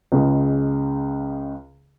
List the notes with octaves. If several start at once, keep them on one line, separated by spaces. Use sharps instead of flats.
C#2 C#3 G#3